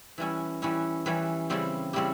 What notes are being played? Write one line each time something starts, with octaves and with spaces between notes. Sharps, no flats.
E3 G3 C#4 E4
E3 G3 C#4 E4
E3 G3 C#4 E4
C#3 G3 C4 E4 G4
C#3 G3 C4 E4 G4